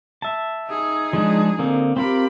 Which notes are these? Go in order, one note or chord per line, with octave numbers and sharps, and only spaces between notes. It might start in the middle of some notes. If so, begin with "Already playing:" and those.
E5 A5
D#4 G#4
F3 G#3 D4
D3 A#3 C4
C4 F4 G4 A#4 B5